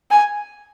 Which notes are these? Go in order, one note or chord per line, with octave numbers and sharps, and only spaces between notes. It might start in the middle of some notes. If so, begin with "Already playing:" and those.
G#5